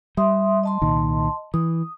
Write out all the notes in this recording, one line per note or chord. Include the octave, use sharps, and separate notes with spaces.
G3 E5 C6 D#6
D#5 A5 C6
C2 A#2 D#3
E3 D#6